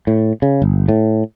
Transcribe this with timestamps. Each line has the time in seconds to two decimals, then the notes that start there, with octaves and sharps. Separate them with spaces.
0.07 A2
0.42 C#3
0.62 G1
0.88 A2